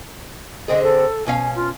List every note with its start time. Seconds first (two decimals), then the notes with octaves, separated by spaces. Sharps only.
0.68 D3 C4 G#4 D#5
0.83 A4
1.26 B2 C#4 F5 G#5
1.55 F4